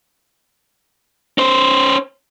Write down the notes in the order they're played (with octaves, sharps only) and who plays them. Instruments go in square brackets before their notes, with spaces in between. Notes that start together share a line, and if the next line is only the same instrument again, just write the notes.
[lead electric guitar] C#4 C5